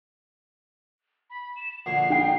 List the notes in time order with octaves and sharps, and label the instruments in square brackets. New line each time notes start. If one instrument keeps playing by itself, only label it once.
[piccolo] B5
E7
[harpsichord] A#1 D3 C#5 [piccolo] C7
[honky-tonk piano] D#4 G5